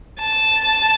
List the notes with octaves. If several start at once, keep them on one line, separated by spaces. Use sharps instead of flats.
A5